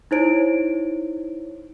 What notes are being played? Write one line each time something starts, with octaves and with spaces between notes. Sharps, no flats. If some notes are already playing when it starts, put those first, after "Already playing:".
D#4 E4 C5 C#5 D7